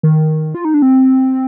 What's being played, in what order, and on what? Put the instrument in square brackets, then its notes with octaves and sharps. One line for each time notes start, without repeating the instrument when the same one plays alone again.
[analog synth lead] D#3
F4
D#4
D4
C4